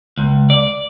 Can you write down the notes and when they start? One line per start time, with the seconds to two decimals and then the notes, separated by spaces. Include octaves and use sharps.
0.17 C#2
0.50 D5